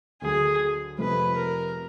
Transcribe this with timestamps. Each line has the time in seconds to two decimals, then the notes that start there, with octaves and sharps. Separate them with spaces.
0.22 D2 D3 F#3 G#4
0.98 F2 C3 F3 A3 B4
1.36 A#4